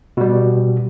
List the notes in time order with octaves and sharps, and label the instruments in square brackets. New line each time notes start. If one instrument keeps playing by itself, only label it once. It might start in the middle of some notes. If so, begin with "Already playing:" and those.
[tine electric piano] B2 G3